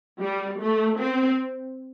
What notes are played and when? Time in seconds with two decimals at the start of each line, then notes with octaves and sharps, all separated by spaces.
0.21 G3
0.60 A3
0.99 C4